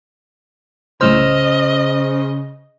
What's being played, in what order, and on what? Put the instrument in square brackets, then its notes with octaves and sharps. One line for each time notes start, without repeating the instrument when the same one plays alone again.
[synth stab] C2 A2 E6 [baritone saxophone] C#3 [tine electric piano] C5 F6 [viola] D#5